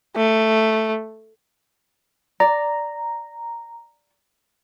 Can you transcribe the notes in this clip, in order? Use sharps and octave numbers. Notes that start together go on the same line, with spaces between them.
A3
D5 A#5